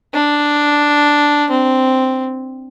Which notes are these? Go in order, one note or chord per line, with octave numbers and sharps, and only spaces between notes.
D4
C4